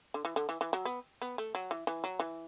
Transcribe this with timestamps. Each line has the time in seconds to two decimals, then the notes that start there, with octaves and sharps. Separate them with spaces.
0.14 D3
0.25 E3
0.36 D3
0.49 E3
0.61 E3
0.73 F#3
0.85 B3
1.22 B3
1.38 A3
1.55 F#3
1.71 E3
1.87 E3
2.04 F#3
2.20 E3